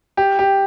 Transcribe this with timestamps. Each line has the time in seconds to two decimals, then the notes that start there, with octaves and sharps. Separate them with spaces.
0.17 G4
0.39 G4